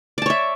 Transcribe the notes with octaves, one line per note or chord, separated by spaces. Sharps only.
C#5 D5 E5 A5